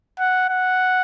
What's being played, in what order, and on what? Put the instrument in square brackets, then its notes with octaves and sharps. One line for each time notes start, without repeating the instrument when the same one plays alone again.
[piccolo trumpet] F#5
F#5